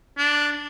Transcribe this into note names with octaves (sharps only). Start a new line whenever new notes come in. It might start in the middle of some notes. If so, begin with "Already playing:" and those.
D4